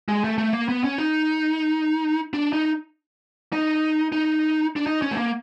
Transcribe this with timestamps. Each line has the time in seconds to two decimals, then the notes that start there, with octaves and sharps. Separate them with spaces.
0.08 G#3
0.24 A3
0.38 A3
0.53 A#3
0.69 B3
0.84 C#4
0.98 D#4
2.34 D4
2.53 D#4
3.53 D#4
4.12 D#4
4.76 D4
4.87 D#4
5.02 C#4
5.11 A3
5.17 A#3